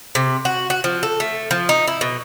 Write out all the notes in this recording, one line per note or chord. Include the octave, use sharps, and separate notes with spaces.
C3
F#4
F#4
F3
A4
A3
F3
D#4
E4
B2